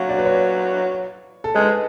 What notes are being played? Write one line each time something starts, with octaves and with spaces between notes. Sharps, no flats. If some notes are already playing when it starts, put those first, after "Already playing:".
Already playing: F#3 F5 F#5
D5
B4
C#5
A4
G#3 B4